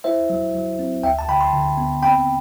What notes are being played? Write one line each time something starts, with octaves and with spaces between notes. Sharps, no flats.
E4 C5 E5
F#3
F#3
C4
D2 E5 G5
A5
D3 G5 B5
A5 C6
D3
B3
C4 G5 B5